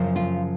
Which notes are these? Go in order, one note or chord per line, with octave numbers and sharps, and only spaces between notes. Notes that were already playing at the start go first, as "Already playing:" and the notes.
Already playing: F#2 C#3 F3
F4